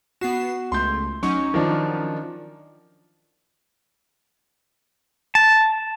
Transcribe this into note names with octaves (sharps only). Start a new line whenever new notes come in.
B3 F#4 C7 E7
C#2 A3 C6 G6
F#3 C#4 D#4 C#6
D#3 F3 D4
A5